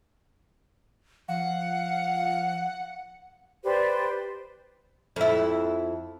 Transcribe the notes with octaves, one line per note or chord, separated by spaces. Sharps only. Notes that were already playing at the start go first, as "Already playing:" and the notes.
F3 F5 F#5
G4 B4 C5 D5
F2 E4